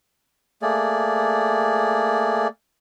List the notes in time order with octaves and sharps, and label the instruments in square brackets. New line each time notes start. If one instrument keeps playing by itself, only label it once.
[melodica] A3 A#3 G#4 D5